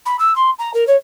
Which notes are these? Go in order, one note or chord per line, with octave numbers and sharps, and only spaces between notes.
B5
E6
C6
A#5
A#4
C#5